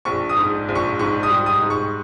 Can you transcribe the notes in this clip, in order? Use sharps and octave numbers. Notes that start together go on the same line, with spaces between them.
A#1 C#6
D#6
G#2
A#1
C#6
G#2 C#6
D#6
G3
D#6
G#2
C#6